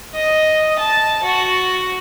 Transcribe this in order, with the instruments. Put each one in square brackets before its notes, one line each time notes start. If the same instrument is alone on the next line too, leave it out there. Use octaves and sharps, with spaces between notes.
[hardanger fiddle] D#5
A5
F#4